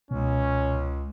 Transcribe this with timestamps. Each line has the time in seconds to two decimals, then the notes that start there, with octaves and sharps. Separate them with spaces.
0.11 C#2 B2 C#4